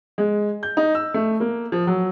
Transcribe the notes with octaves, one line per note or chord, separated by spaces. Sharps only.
G#3
G6
D#4
E6
A3
A#3
F3
F#3